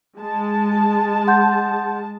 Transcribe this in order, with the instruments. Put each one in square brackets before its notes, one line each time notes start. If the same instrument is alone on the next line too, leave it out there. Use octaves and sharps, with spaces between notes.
[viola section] G#3 A5
[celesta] F#5 C6 G6